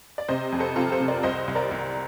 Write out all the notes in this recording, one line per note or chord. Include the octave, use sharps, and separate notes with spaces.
D5
C3 C5 D#5
F2
A4 C5
C3 F4 A4
A4 C5
C3
A#4 D5
C2 C5 D#5
C2
A#4 D5
C2